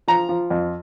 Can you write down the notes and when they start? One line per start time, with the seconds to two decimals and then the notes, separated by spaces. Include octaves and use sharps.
0.08 F3 A#5
0.29 F3
0.50 F2